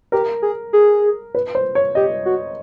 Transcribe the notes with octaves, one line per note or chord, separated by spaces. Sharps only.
G4 A#4
G#4
G#4
B4
C5
C#5
G4 D#5
F#4